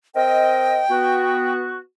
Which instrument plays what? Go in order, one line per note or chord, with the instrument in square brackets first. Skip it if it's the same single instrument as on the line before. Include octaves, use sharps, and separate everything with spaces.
[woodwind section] C4 A#4 D#5 [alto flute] G5
[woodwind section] B3 F#4